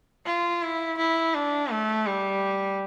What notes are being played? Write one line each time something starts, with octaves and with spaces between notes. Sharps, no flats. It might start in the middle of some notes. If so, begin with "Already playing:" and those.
F4
E4
E4
D4
A3
G3